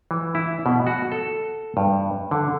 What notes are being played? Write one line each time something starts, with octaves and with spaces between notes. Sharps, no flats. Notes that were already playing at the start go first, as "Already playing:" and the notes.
E3
E4
B2
F#4
A4
G2
D3